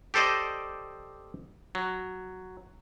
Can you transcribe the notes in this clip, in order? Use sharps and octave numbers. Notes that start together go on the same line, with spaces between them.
G4 A4 C5 D5 D#5
F#3